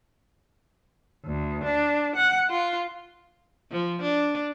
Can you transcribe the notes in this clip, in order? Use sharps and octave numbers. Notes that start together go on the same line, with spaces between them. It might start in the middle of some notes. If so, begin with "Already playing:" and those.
D2
D4
F#5
F4
F3
D4